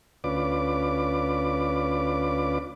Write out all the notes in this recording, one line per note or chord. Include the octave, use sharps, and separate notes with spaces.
D2 C#4 F4 B4 D5 D6